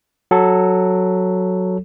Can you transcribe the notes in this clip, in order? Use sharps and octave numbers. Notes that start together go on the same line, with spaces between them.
F#3 A4